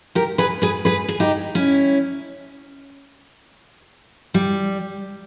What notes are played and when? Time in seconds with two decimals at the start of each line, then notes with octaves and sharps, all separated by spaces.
0.15 G4 A#4
0.38 G#4 B4
0.62 G#4 B4
0.85 G#4 B4
1.08 G#4
1.20 D#4 G4
1.55 C#4 E4
4.34 G3